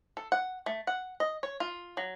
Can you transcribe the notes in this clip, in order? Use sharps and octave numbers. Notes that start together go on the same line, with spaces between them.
A4
F#5
A3
F#5
D#5
C#5
F4
F#3